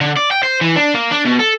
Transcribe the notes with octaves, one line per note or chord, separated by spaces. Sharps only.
D3
D5
G5
C5
E3
D4
A#3
D4
B2
A4